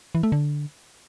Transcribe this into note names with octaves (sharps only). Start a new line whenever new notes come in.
E3
A3
D3